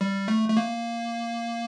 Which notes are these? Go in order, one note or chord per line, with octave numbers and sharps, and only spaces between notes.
G3
A3
A3
A#3